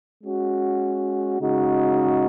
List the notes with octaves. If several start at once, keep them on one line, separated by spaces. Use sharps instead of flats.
G#3 C#4 F#4
C#3 G#3 D#4 F#4